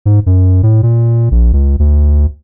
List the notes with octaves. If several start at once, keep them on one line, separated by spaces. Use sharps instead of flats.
G#2
F#2
A2
A#2
A#1
C#2
D2